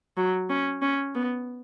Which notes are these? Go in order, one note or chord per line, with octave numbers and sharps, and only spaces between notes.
F#3
C#4
C#4
B3